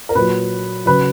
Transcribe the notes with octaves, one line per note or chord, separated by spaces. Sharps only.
A#4
A#2 F#3 B4
C#3 F#3 B4